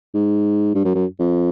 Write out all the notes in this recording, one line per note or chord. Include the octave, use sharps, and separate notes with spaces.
G#2
G2
F#2
F#2
F2